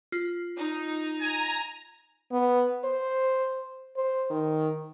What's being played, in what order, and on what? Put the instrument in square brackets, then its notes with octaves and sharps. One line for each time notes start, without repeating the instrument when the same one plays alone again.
[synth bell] F4
[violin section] D#4
[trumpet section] G#5 [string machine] A#5
[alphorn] B3
C5
C5
D#3